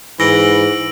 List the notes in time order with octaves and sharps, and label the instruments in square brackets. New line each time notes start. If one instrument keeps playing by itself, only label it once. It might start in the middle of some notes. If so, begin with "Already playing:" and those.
[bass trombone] G#2 [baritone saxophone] E3 [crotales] E6 D7 F#7 [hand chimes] A#6